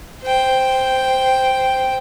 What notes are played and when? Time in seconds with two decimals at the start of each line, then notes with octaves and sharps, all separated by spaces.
0.23 C5 G5